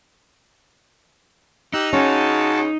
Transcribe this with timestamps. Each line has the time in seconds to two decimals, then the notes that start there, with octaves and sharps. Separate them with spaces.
1.74 D#4 G4 E6 F#6
1.93 C#3 C#4 F#4 A5